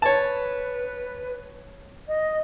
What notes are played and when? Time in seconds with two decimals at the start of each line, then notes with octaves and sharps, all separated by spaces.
0.02 B4 C#5 A5
2.08 D#5